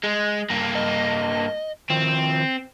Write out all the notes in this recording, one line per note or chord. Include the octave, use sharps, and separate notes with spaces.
G#3
G2 A#3
D#5
D#3 F3 C4